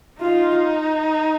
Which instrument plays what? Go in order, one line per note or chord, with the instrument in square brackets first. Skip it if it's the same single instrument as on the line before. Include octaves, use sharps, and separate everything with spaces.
[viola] D#4 [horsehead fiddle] F4